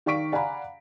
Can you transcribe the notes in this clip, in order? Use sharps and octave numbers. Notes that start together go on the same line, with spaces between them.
D#3 D5 F5 C#6 B6 D7
D5 F5 F#5 G#5 A#5 B5